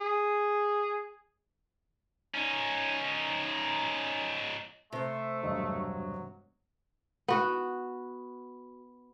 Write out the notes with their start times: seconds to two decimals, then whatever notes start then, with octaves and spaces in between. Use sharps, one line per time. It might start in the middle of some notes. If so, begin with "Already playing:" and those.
0.01 G#4
2.35 C#4 D#4
4.92 C3 A3 C5 E5
5.43 E1 G2 F#3 D#5
7.28 B3 F#4